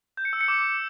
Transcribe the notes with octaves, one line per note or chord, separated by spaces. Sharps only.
G6
C#7
E6
C#7
D6